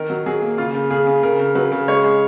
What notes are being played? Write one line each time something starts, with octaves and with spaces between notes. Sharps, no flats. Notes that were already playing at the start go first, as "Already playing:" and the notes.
Already playing: D#3 A#4
F#3
F#3 G#4
A#3
C#3 F4
C#3
C#3 G#4
C#3
C#3 A#4
C#3
F#3 B4
C#3
G#3 C#5
G#3